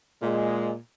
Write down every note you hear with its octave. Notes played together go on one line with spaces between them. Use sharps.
A#2 G#3